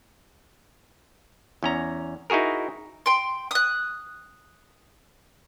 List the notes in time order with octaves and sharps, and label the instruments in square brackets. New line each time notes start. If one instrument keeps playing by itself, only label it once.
[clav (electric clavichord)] E2 C#4 A#5
D#4 E4 F#4 G#4 A#4
[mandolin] G5 C6
D#6 F#6